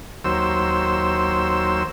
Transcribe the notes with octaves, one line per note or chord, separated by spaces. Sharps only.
D#2 F#3 C5 E6